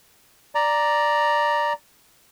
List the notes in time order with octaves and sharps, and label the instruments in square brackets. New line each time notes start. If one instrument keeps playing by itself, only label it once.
[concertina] D5 A#5